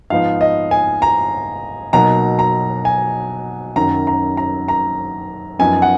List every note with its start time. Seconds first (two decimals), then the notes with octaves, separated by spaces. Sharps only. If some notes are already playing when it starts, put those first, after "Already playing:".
0.10 G#2 F3 B3 D#4 F5
0.41 D#5
0.71 G#5
1.02 A#5
1.93 B2 F#3 A#3 D#4 A#5
2.39 A#5
2.85 G#5
3.76 F#2 D#3 F#3 C#4 A#5
4.07 A#5
4.37 A#5
4.68 A#5
5.59 F#2 F3 B3 D#4 G#5
5.82 F#5